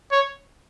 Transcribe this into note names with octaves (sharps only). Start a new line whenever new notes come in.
C#5